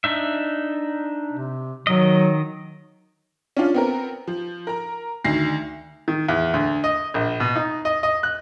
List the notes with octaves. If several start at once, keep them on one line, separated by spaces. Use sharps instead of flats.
D4 D#4 E5
C3
D#3 F#3 D#5
C#4 D4 F4
B3 C4 A#4
F3
A#4 A#5
D2 D#3 A#6 C7
D#3
E2
D2
D#5
A#1
B2
D#4
D#5
D#5
F#6